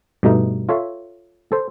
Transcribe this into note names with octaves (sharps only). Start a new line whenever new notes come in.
G2 B2 A3 D#4
F4 A4 C#5 E5 F5
A4 C5